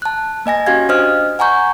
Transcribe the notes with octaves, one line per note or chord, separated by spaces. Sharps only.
A5 F#6
A#3 D#5 G#5 A#6
C#4 F#4 G4 F5 G#6
D4 C5 D#5 F6
F#5 G#5 A#5 C#6 G6